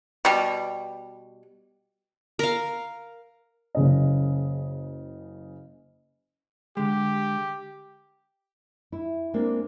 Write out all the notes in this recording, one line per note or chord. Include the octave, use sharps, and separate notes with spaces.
B2 G3
A#4 F5
F#1 C#3 D#5
D3 G#3 G4
E4
G#3 A#3 C4 D4